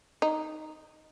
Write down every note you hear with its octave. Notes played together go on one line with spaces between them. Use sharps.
D#4